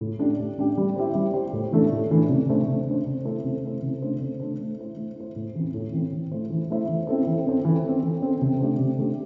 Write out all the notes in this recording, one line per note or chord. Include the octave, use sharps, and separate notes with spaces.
A2
A3 D4 G4
A2
A3 D4 G4
G3
E4 G4 C5
G3
E4 G4 C5
A2
E3 A3 D4 A4
A2
E3 A3 D4 A4
C3
A3 D4 C5
C3
A3 D4 C5
C3
A3 E4 A4 C5
C3
A3 E4 A4 C5
C3
A3 D4 A4 C5
C3
A3 D4 A4 C5
A3
E4 C5
A3
E4 C5
A2
E3 C4
A2
E3 C4
E3
A3 E4 C5
E3
A3 E4 C5
E3
C4 E4 A4 C5
E3
C4 E4 A4 C5
E3
C4 A4
E3
C4 A4
C3
A3 D4 G4 C5
C3
A3 D4 G4 C5